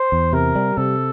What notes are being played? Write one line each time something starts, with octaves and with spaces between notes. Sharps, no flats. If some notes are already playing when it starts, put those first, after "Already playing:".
Already playing: C5
E2
C3 A#4
G3
C3 A4